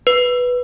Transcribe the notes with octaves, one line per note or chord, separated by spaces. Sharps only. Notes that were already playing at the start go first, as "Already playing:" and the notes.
B4